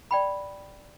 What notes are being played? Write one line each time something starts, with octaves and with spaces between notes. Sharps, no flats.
D5 G5 B5